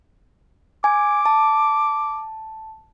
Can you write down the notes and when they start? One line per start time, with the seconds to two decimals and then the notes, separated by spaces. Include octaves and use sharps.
0.84 G#5 D6
1.26 A5